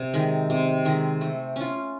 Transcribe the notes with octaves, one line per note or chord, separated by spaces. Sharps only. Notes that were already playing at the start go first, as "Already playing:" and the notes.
Already playing: C3
D#3 G#3
C3
D#3 G#3
A3
C#4 F4